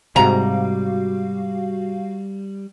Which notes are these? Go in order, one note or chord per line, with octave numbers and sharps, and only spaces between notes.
G#2 C3 G3 F#4 F5 A#5